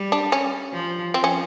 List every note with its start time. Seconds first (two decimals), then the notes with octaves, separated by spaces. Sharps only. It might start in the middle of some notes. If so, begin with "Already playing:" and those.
Already playing: G3
0.12 D4
0.32 C#4
0.73 F3
1.14 F3 C4
1.24 C#4